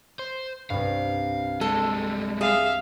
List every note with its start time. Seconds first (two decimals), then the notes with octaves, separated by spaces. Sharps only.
0.19 C5
0.70 C2 G2 F5
1.61 G3 G#3 A4
2.41 G#4 E5 F5